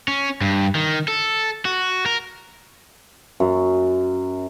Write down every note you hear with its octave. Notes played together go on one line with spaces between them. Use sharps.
C#4
G2
D#3
A4
F#4
A#4
F#2